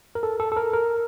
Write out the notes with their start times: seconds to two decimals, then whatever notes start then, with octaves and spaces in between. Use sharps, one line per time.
0.15 A#4
0.23 A4
0.40 A4
0.52 A4
0.57 A#4
0.73 A#4